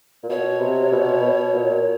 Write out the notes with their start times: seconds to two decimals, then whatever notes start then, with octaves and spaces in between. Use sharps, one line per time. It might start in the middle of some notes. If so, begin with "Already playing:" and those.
0.23 A#2
0.29 B2 C#5
0.60 C3
0.92 B2
1.22 B2
1.54 A#2